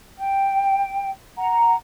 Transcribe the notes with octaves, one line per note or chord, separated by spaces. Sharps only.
G5
F#5 A#5